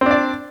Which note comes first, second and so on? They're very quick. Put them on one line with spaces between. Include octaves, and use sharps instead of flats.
C4 D4 D5